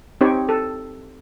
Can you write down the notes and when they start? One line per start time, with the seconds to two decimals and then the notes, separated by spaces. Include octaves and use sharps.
0.21 C4 D#4 G4 C#5
0.49 A4